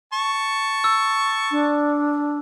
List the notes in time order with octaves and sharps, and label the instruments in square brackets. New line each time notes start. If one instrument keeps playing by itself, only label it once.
[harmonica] A5 C#6
[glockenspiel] E6
[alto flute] D4